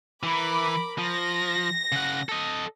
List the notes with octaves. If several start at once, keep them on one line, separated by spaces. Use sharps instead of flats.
E3 E4 A#4 B5 D6
F3 A#6
C#3 F#5
A4 D#5